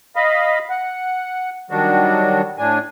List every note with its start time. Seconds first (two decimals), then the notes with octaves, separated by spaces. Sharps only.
0.16 D#5 F5 B5
0.69 F#5
1.70 D#3 F#3 G3 D4 F#4
2.58 A2 D4 G#5